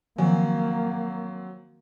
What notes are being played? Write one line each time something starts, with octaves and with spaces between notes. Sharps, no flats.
D#3 F3 F#3 A#3 C4 G#5